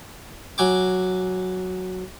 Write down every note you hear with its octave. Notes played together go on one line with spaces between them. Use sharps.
F#3 G#5 D6